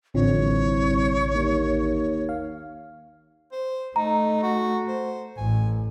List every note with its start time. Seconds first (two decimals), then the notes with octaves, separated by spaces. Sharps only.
0.15 A1 F2 D3 C#5
0.39 C2
1.34 D#2
2.29 F5
3.52 C5
3.96 A3 D#4 A#5
4.43 F#4
4.88 C5
5.37 A1 G#5